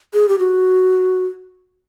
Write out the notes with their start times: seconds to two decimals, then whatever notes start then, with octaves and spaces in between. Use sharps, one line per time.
0.14 G#4
0.29 G4
0.39 F#4